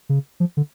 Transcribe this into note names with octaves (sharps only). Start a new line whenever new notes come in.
C#3
F3
D3